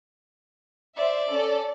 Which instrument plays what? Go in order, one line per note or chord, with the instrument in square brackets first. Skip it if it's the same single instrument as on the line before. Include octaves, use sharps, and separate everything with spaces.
[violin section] C5 E5 [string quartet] D5
[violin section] C#4 A4